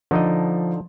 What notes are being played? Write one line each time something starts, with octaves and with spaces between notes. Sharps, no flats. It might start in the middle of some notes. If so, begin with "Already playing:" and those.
D3 F3 D#4 D#5